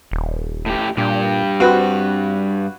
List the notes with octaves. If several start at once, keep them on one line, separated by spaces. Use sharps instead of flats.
D#1
A2 G4
G2 A#2 G4
C4 F#4 B4